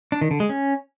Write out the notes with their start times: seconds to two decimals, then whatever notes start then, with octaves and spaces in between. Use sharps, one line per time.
0.12 D4
0.21 D#3
0.31 D3
0.40 G#3
0.49 C#4